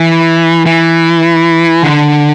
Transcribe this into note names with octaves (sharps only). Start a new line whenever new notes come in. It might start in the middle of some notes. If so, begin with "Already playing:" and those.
Already playing: E3
E3
D3